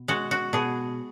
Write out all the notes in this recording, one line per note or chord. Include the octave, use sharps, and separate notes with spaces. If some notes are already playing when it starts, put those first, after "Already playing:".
Already playing: B2
G#3 F#4
F#4
B2 G#4